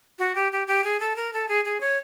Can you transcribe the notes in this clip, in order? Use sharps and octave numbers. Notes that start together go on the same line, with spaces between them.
F#4
G4
G4
G4
G#4
A4
A#4
A4
G#4
G#4
C#5